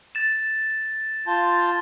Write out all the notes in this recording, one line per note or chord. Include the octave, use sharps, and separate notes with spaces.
A6 E7
F4 A5 G6